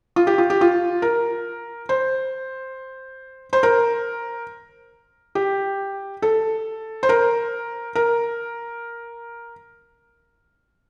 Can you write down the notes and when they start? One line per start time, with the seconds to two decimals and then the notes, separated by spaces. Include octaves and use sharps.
0.16 F4
0.27 G4
0.38 F4
0.50 G4
0.61 F4
1.02 A#4
1.89 C5
3.53 C5
3.63 A#4
5.35 G4
6.22 A4
7.03 C5
7.09 A#4
7.95 A#4